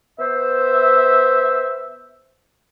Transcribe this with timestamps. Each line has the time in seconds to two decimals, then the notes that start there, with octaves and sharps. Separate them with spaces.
0.19 B3 C5 E5